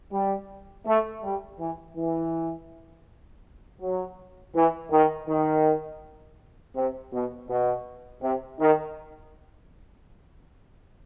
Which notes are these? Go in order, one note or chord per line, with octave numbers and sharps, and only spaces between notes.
G3
A3
G3
E3
E3
F#3
E3
D#3
D#3
C3
B2
B2
C3
D#3